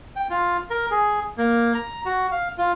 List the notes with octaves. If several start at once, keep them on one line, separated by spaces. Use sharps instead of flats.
G5
F4
A#4
G#4
A#3
A#5
F#4
F5
F4